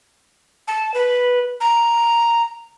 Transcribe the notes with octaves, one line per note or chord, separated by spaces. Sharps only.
A5
B4
A#5